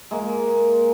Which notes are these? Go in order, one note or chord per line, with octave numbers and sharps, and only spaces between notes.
G#3 A#3